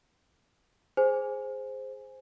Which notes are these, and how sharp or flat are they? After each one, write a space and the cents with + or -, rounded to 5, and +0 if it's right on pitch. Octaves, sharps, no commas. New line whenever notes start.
G#4 +0 C5 +0 G#5 +0